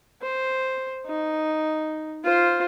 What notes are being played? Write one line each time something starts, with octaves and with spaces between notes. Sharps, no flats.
C5
D#4
F4 C5